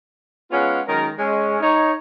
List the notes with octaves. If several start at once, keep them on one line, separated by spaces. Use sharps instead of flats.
G#3 B3 C#4 F4 F5 F#5
D#3 F#3 G#3 C#4 A#4
G#3 C#4
D#4 C#5